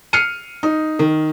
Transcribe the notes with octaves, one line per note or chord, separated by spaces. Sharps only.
F6 C7 C#7 D#7
D#4
D#3